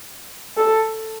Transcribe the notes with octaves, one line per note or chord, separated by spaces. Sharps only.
A4